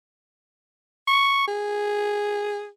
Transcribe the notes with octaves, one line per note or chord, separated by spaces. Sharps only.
C#6
G#4